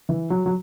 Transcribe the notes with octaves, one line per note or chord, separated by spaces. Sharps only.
E3
F#3
F#3